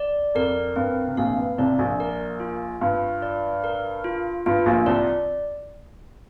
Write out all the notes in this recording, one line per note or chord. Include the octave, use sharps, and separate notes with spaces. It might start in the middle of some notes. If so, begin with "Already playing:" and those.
Already playing: D5
F2 A#4
G2 C4
C3
A#1 A#2 F5
G2
C2 C3 D5
A#1 A#2
A#4
F4
G2 F4
D5
A#4
F4
G2 F4
A#1 A#2
C2 C3 D5